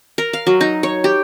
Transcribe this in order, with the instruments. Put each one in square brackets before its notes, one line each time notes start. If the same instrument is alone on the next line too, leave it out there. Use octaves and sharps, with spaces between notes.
[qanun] A#4
F5
F#3
D#4
C#5
G4